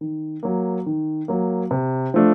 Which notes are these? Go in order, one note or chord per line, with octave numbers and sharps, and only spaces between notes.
D#3
F#3 A#3
D#3
F#3 A#3
C3
F3 A3 D4